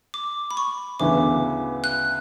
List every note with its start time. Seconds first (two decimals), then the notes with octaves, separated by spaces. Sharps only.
0.14 D6
0.51 B5
0.57 C#6
0.99 D2 C#3 E3 B3 E4 D6
1.84 F#6